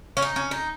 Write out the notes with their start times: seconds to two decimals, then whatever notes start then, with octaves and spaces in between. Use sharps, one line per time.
0.17 C#4
0.22 D#4
0.36 C#4
0.51 D#4